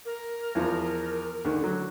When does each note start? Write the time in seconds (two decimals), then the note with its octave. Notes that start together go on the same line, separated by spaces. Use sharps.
0.06 A#4
0.55 E2 F3
1.45 D2 D3 D#3
1.61 D3 F#3